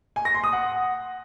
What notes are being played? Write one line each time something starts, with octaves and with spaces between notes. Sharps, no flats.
G#5
A#6
C6
D#6
F#5